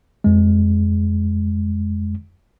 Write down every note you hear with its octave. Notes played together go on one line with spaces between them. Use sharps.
F2 G#3